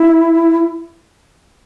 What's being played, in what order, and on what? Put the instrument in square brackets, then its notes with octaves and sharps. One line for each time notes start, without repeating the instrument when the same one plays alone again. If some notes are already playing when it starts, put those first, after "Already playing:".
Already playing: [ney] E4